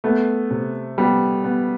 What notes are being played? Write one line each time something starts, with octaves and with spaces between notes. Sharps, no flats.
A3 B3
C3
G3 B3
B3